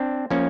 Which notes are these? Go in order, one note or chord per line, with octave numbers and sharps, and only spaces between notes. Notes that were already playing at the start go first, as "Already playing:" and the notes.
Already playing: C4 D4
F3 A#3 C#4